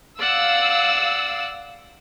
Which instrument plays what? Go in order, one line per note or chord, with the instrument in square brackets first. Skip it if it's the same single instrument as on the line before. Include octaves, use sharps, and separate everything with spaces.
[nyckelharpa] D5 F#5 [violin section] F5 E6